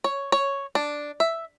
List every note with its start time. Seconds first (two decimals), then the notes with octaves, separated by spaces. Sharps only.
0.04 C#5
0.32 C#5
0.75 D4
1.20 E5